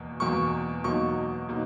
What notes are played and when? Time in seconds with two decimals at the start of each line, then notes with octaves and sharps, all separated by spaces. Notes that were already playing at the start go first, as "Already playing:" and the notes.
Already playing: E2 B2 A#3
0.20 E2 B2 A#3 C#6
0.84 E2 B2 F#3 A#3 D#4 C#6
1.49 B2 F#3 A#3 D#4